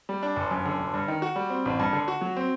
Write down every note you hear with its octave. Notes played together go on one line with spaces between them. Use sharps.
G3
D4
G1
F#2
D3
G1
G2
D#3
F#4
G3
C4
A1
G2
D3
F#4
F#3
C4